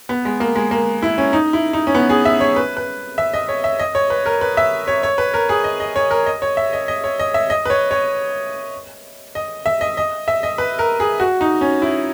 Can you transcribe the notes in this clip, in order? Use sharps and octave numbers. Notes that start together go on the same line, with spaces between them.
B3
G#3
A#3
G#3
A#3
E4
C#4
D#4
E4
D#4
C#4
B3
G#4
E5
C#5
B4
B4
E5
D#5
C#5
E5
D#5
C#5
B4
A#4
B4
E5
C#5
C#5
B4
A#4
G#4
D#5
D#5
C#5
A#4
D#5
C#5
E5
D#5
D#5
C#5
D#5
E5
D#5
B4
C#5
C#5
D#5
E5
D#5
D#5
E5
D#5
B4
A#4
G#4
F#4
D#4
C#4
E4